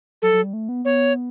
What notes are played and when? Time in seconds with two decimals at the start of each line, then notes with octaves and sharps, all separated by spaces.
0.22 F#3 A4
0.33 F#3
0.44 G3
0.53 A3
0.69 B3
0.85 B3 C#5